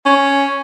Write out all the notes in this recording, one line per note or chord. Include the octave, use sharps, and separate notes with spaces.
C#4